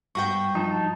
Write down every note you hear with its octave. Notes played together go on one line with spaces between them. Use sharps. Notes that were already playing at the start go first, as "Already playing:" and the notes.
G2 F#4 G5 C#6
F3 D#4 A5